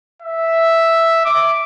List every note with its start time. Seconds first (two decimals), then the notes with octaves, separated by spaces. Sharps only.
0.22 E5
1.25 D6